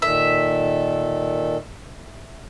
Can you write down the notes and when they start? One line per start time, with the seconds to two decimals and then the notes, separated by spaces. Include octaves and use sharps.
0.02 A#2 D#3 A4 E5